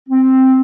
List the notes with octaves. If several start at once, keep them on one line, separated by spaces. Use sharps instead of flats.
C4